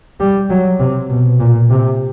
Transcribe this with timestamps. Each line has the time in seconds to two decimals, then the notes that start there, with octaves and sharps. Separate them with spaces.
0.20 G3
0.50 F#3
0.80 C3
1.10 B2
1.40 A#2
1.70 C3